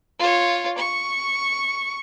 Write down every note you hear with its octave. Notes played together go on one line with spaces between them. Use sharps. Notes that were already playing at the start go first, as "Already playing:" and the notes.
F4 C#5
C#6